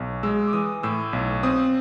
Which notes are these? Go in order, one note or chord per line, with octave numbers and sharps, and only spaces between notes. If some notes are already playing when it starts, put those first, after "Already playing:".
Already playing: B1
G#3 E6
D6
E3 D#6
A2 E6
B1
C4 D#6